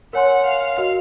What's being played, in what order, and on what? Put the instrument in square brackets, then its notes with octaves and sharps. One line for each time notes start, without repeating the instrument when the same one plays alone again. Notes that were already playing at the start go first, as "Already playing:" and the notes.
[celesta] A#4 C#5 G#5 C6 [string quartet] F#5
[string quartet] F5
[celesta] F#4 A#4 D#5